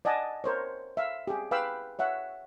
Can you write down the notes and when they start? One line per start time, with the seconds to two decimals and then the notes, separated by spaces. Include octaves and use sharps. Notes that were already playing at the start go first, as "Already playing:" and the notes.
0.05 D5 D#5 F#5 G#5 A5
0.44 A#4 C5 C#5
0.97 E5 F5
1.27 G4 G#4
1.51 B4 F5 G5 B5 D6 E6
1.99 C#5 E5 F#5